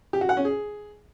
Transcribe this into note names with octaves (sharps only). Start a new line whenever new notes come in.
G4
F#4
F#5
C#4
G#4